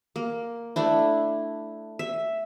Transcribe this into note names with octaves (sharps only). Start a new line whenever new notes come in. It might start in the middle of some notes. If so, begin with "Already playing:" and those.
A#3
A3 D4 E4
E5